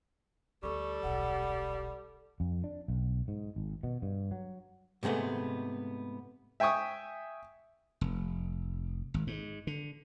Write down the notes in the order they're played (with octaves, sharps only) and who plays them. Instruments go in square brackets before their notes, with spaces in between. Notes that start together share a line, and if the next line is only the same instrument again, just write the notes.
[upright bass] D2 A3 [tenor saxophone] G3 [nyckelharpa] A4 [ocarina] C#6
[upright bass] D#1 B1 [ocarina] F#5
[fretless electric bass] F2
D4
B1
G#2
G#1
B2
G2
F#3
[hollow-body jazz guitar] G#2 C3 G#3 A3 B3
[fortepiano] E5 G5 G#5 C#6 D#6
[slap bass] F1
G#1
G#2
D3